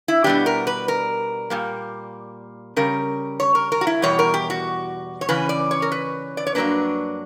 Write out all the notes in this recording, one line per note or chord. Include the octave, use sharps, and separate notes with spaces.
E4
B2 G3 B3 D4 G4
A#4
B4
A#4
A#2 G3 A#3
C#3 G3 C#4 A#4
C#5
A#4
A#4
F#4
E4
E2 B2 G3 C#5
A#4
G4
F#4
C#5
C#3 E3 C#4 B4
D5
C#5
A#4
B4
D5
C#5
G2 F#3 A#3 D4 B4